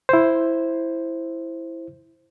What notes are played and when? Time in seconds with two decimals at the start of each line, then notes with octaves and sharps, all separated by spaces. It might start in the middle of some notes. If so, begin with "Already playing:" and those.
0.09 E4 C5